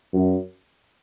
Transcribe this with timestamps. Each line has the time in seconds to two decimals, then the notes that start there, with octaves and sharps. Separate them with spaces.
0.13 F#2